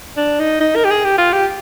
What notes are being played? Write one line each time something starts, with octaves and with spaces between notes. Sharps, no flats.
D4
D#4
D#4
A#4
G4
G#4
G4
F4
G4